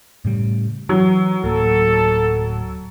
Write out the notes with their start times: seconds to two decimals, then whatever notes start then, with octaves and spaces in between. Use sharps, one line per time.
0.25 A2 C#3 G3
0.89 E3 F#3
1.44 D1 A#3 A4